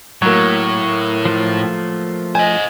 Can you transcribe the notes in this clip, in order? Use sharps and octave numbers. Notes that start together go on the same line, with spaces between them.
A2 F#3 A#3 C#5
F3 A3 F4
C5 D#5 G#5